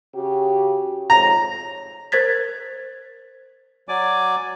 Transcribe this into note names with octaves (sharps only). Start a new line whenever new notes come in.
C#3 F#4 G4
F2 G#2 C#5 A#5
A#4 C5 G#6 A6 B6
F#3 D5 G#5 D6